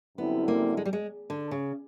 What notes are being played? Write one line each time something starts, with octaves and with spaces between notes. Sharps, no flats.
F#2 D3 G3 B3 C4 E4
A#3
G#3
G3
G#3
D3
C#3